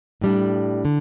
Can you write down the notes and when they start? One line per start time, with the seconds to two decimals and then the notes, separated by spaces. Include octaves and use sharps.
0.21 A2 G3 D4
0.85 D3